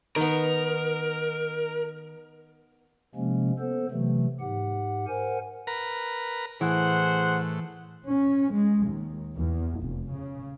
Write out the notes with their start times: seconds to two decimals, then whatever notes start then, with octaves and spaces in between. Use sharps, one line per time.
0.16 D#3 B3 D#4 A#4
3.15 C3 F3 G#3 A#3 C#4
3.59 B3 A4 C5
3.91 C3 E3 F#3 A3
4.40 G#2 G4 F#5
5.07 A#4 C5 F#5 G#5
5.67 A#4 B4 A#5
6.61 A2 E3 G#4 C5 F#5
8.08 C#4
8.53 G#3
8.86 D#2
9.35 E2
9.82 F1
10.14 C#3